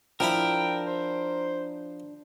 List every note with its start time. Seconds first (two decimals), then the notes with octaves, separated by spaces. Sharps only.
0.20 F3 D4 E4 A#4 G5 B5
0.87 C5